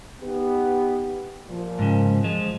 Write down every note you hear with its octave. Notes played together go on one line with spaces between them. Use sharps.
B3 D#4 G4
A#2 F3
G#2 C#3
F3 G#3